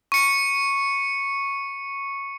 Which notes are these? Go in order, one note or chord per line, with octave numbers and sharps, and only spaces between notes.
C#6 C#7